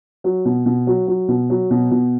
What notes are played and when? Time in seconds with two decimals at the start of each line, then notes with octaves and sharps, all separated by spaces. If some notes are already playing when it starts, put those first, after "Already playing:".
0.24 F#3
0.45 B2
0.66 B2
0.87 F#3
1.08 F#3
1.28 B2
1.50 F#3
1.71 B2
1.91 B2